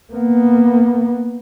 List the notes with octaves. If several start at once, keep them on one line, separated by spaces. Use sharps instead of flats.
A#3 B3